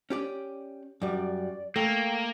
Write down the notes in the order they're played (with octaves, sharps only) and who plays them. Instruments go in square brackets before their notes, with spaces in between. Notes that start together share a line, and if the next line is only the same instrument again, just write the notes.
[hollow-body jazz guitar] C#4 G4 D5
[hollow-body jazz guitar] F#2 G3 [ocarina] D5
[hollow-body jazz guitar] A3 [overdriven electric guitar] A#3 [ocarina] G5